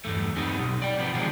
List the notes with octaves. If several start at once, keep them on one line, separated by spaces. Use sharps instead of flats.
E2 G2 A3
B3 C4 D#4 G4
B1
D5 G5
C3 F3 B3
D#3 F3 G#3 C4 D4